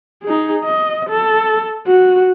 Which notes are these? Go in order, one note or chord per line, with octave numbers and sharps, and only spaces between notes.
D#4 G#4
D#5
A4
F#4